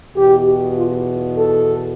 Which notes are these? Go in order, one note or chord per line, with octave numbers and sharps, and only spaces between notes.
E2 B2 G4
F4
A4